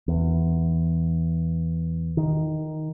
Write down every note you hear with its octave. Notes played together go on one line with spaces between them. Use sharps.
E2
D#3